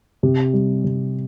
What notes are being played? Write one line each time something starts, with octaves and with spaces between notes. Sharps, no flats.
C3
G3
C3